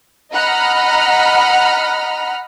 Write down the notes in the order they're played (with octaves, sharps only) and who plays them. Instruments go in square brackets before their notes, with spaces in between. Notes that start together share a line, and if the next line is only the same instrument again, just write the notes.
[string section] D#5 F#5 A#5 B5 F6